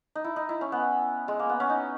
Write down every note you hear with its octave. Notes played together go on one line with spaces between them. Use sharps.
D#4
E4
D#4
E4
C#4
B3
G#3
A#3
B3
C#4
D#4